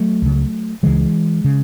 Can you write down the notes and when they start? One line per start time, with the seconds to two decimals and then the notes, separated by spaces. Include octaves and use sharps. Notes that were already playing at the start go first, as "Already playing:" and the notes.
Already playing: F#3 A3
0.22 C#2 C#3
0.83 C#2 C#3 E3 G#3
1.44 C#3